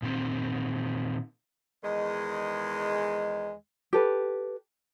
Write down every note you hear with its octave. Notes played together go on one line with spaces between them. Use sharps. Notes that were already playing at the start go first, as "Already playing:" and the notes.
A#2 D#3 C4
E2 D#3 G#3
G4 A4 B4